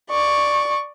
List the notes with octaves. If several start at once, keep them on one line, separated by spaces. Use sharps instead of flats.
D5 C#6